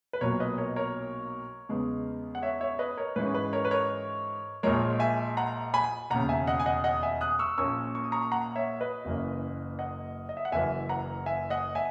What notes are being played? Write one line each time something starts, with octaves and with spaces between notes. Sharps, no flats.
B4
B1 A#2 F#3 A#3 A#4 C#5
B4 D#5
A#4 C#5
A#4 C#5
E2 C#3 G#3 B3
F#5
C#5 E5
C#5 E5
B4 D#5
A#4 C#5
G#2 E3 G#3 C#4 B4
B4
A#4 C#5
B4
A#4 C#5
A#1 A#2 G#3 A#4 C#5
E5 G#5
F#5 A#5
G#5 B5
E1 D#2 C#3 F#5 A#5
E5 G#5
D#5 F#5
G#5
D#5 F#5
D#5 F#5
E5 G#5
D#6 F#6
C#6 E6
A#1 A#2 A#3 C#4 C#6 E6
C#6
D#6
A#5 C#6
F#5 A#5
C#5 E5
B4 D#5
F#1 F#2 E3 A#3 C#4
D#5 F#5
D#5
E5
F#5
F#1 F#2 E3 E5 G#5
F#5 A#5
E5 G#5
D#5 F#5
E5 G#5